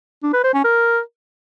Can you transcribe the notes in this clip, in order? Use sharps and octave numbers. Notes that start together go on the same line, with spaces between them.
D4
B4
C5
C#4
A#4